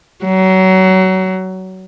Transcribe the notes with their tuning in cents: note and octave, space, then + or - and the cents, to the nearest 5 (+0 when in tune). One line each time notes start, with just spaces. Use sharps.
F#3 +25